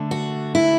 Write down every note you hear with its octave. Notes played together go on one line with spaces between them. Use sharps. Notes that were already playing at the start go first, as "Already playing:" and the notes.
Already playing: D3 A3 D4
F#4
E4